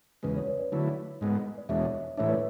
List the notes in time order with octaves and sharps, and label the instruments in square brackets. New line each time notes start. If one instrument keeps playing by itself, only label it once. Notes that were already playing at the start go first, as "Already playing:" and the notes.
[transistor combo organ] E2 C#3 G#3 [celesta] B4
[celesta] C#5
B4 D5
B4 D5
[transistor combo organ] D3 F#3 A3 E4
G#2 G#3 B3
[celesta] D5
[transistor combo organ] E2 B2 G#3 D4 [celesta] C#5 E5
[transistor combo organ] A2 E3 A3 D4 [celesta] C#5 E5
[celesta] B4 D5